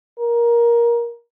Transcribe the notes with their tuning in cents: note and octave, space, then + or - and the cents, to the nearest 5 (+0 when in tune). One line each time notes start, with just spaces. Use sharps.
A#4 +15